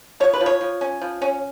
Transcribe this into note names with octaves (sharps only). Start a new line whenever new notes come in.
F3 C#5
B4
F3
C#5
F3
C#4
F3
C#4